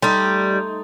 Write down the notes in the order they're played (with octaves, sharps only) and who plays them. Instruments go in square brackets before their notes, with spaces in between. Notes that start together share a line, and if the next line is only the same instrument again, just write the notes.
[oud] G3 [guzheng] A3 D#4 [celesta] C6